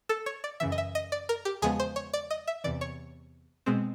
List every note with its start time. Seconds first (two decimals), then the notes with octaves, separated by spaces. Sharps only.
0.09 A4
0.26 C#5
0.44 D5
0.60 F#2 C#3 E3 E5
0.72 D#5
0.78 E5
0.95 D#5
1.12 D5
1.29 A#4
1.45 G4
1.62 E2 C#3 F3 G#3 B3 G#4
1.80 C5
1.96 C#5
2.14 D5
2.30 D#5
2.47 E5
2.64 E2 C3 E3 D5
2.81 C#5
3.66 B2 G#3 C4